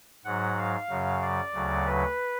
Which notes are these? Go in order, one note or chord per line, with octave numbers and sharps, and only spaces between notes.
G#2 F#3 F#5
F5
F#2 C#3 F#3
D5
D2 C#3 F#3
B4